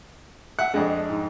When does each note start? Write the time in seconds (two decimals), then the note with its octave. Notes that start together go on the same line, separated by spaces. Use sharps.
0.59 E5 F#5
0.74 F2 G#3 D4 G#4
1.10 G#2